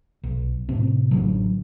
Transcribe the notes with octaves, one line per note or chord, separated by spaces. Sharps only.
B1
A2 C3 C4
A1 D3 F#3